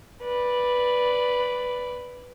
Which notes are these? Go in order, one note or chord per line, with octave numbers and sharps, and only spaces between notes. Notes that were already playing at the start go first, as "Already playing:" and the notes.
B4 D5